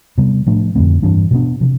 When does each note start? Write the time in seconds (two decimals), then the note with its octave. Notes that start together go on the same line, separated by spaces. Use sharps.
0.18 C3 G3 B3
0.47 A2 F3 A3 D4
0.75 F2 D3 A3 C4
1.02 G2 E3 G3 D4
1.31 B2 G3 B3 D4
1.61 C3 F3